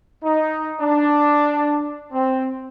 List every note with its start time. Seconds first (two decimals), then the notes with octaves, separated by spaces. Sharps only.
0.23 D#4
0.80 D4
2.12 C4